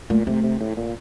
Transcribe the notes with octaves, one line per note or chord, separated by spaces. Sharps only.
A#2 A3
C3 A3
C3
A2
A#2